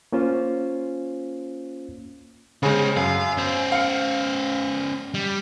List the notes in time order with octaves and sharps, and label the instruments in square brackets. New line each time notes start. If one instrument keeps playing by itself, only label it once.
[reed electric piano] A#3 C#4 F4 C5
[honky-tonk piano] C#3 G#3 [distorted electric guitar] C#4 C5
[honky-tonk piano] F#2 [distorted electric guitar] F5
[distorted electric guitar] C#4 C5
[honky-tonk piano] F5 C#7
[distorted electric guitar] G3